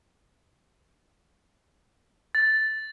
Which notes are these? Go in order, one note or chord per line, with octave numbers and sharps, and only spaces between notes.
A6